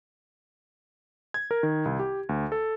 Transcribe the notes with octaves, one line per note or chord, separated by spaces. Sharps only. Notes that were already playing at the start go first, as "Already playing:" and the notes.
G#6
A#4
D#3
C2
G4
D2
A4